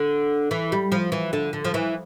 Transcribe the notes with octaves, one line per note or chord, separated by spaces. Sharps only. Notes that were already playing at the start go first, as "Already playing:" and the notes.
Already playing: D3
E3
G3
F3
E3
D3
D3
F3
E3